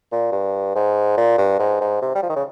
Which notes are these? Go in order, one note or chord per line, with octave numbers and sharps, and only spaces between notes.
A#2
G2
G#2
A#2
G2
G#2
G#2
C3
G3
F3
D#3
C#3